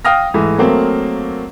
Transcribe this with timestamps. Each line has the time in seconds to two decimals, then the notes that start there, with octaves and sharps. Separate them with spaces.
0.05 F5 G5 D#6 F6 A#6
0.34 G#2 E3 A3
0.58 F#3 A3 A#3 C4